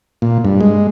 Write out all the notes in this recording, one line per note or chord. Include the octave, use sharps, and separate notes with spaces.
A#2
G2
G#3